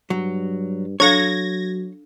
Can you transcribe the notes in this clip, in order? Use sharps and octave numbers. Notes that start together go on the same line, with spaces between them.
G2 F#3
F#3 D4 A4 C#5 F5 G#6 A#6